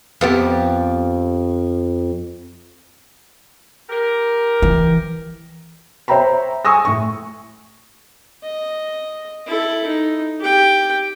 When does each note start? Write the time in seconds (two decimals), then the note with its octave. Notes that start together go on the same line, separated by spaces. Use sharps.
0.21 F2 B3 G4
3.90 G4 A#4
4.62 E3
6.08 C5 C#5 E5 G5 A#5 B5
6.65 G#5 C#6 D#6 E6 A#6
6.85 A2 C#6
8.43 D#5
9.46 E4 A4
9.86 D#4
10.39 G4 G5